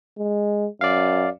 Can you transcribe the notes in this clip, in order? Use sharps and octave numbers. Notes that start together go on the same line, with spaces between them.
G#3
F#2 D5 F5